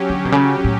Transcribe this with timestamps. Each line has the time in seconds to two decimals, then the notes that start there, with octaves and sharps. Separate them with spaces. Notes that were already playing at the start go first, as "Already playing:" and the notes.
Already playing: F#3 C#4 G4
0.10 D3
0.25 B2
0.32 C#3
0.64 A2